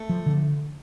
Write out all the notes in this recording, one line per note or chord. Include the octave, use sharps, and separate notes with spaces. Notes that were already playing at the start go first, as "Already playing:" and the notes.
Already playing: A3
F3
D3